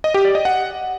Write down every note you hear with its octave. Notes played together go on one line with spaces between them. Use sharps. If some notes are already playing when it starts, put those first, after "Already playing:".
D#5
G4
D5
D#5
F#5